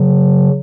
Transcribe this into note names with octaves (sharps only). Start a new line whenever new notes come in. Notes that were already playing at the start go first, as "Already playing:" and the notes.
Already playing: C#3 F#3